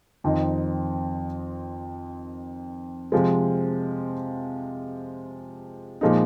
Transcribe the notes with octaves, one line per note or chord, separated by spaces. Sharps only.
F2 D#3 C4 D#4
C3 F3 G#3
A#2 F3 G#3 D#4